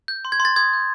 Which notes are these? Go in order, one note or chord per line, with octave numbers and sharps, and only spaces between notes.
G6
C6
G#6
C6
A6
D#6 G#6
G6